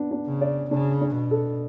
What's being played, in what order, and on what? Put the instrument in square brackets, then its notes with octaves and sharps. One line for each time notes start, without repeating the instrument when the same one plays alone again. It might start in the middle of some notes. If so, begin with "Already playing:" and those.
Already playing: [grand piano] B3 D4
D4
[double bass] C#3
[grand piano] D5
[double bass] C#3 [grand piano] D4
[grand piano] D4
[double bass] B2
[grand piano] A4